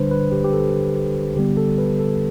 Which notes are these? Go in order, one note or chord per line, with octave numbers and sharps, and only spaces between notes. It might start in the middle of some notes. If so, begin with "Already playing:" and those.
Already playing: D3 G3 D4 B4 C5
B4
G4
G4
A4
D3 G3 B3 G4
A4
B4
A4